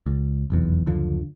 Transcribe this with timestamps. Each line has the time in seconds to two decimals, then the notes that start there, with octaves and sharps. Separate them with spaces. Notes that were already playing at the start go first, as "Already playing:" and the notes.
0.06 C#2
0.50 F1 B1 E2
0.86 F#1 D2 D3 F3